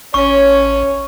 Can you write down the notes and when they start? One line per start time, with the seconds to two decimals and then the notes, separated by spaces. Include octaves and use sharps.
0.14 A1 C#4 C#5 C#6